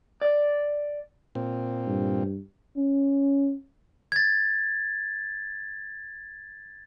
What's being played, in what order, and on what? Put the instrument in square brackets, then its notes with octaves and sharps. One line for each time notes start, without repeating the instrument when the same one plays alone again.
[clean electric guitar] D5
[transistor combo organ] A#2 C4
[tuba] G2
[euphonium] C#4
[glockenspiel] G#6 A6